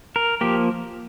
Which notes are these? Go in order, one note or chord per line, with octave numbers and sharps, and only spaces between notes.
A#4
F3 A#3 G4